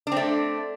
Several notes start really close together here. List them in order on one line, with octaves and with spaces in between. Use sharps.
D4 C4 A3